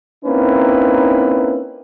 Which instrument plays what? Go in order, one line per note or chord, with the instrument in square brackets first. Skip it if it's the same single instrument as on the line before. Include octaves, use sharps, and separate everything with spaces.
[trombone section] A#3 C4 C#4 D#4 E4 B4